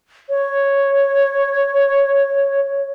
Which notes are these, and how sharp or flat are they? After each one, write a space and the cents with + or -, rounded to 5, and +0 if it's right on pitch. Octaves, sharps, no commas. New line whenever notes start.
C#5 -5